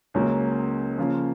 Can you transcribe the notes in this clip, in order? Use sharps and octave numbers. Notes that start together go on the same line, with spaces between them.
C#2 C#3 F#3 A#3 C#4
C#3 F3 A#3 C#4 F4